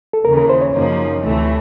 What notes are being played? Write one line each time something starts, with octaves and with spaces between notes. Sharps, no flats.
A4
D#2 C#3 E3 A#4
A#4
C5
C#5
F#2 C#3 F3 A#3 D#4
D2 C3 E3 A3